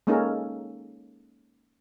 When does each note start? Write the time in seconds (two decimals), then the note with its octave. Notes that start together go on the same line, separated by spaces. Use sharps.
0.07 G#3 A#3 C#4 D#4 A4 A#4